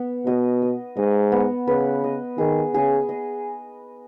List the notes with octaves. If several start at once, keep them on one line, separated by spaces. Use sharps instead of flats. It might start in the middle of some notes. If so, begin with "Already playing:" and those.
Already playing: B3 B4
B2 D#5
D#5
G#2 D#5
B3
C#3 B4
D#5
D#3 G#4
C#3 G#4
D#5